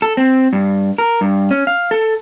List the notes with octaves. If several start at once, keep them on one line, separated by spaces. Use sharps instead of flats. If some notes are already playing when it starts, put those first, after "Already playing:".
A4
C4
G2
A#4
G2
C#4
F5
A4